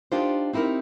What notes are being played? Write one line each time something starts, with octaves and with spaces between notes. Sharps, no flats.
D4 D#4 F4 G4 A#4 C5
C4 D#4 E4 G4 A#4